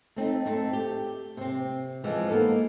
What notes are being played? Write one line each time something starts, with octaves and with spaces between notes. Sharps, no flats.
A3 C4 D#4
A3 C4
G4
C3 C4
E3 F3 G#3
A#3 B3 D#4 A4